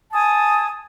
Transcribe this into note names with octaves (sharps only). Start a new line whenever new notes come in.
G#5 A5 D#6